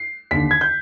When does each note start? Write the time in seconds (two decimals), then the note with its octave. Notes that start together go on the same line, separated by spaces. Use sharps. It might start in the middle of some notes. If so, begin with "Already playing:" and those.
Already playing: C7
0.31 D#2 D3 B6
0.51 G#6
0.61 G6